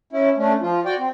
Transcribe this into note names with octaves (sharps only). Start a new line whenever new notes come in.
C#4 E4
A3 C#4 D4
F3 F4
F#4 D5 G5
C4